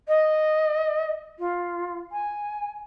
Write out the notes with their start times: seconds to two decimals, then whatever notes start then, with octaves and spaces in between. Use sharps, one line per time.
0.08 D#5
1.39 F4
2.12 G#5